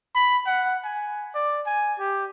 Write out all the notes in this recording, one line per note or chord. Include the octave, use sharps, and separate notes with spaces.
B5
F#5
G#5
D5
G#5
G4